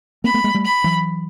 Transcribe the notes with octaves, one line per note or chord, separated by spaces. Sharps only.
A#3 C4 B5
A3 B3
G#3 A#3
G3 A3
B5
E3 F#3